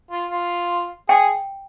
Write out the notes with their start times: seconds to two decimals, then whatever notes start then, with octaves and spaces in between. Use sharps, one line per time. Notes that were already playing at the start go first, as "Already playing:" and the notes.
0.11 F4
0.31 F4
1.09 G#4 G5